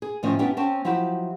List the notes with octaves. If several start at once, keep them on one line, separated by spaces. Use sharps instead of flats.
G#4
A2 D#3 F3 C4 C#4 D#5
G2 B3 C#4 D4 E4 G4
C4 C#4 G5 A5
F3 F#3 E4 F#4 G4